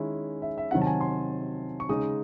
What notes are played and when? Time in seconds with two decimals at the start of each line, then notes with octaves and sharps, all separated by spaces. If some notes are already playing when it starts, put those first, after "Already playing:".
Already playing: D#3 G#3 C#4 E4
0.42 E5
0.58 E5
0.71 C3 D#3 F#3 F#5
0.82 A5
0.87 G#5
1.01 C6
1.80 C#6
1.89 C#3 G#3 D#4 D#6